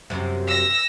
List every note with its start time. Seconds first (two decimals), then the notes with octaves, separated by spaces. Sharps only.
0.10 F#2 C3
0.48 E6 A#6